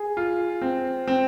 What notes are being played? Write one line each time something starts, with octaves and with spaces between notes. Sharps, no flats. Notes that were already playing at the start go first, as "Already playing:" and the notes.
Already playing: G#4
F4
C4
C4